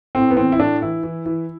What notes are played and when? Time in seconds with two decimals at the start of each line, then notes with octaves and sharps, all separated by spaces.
0.15 A2 C4
0.31 B3
0.37 E3 C4
0.52 E4
0.59 A2 D4
0.82 E3 E4
1.03 E3
1.26 E3